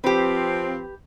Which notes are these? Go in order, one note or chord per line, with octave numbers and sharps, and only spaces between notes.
F3 C4 G4 B4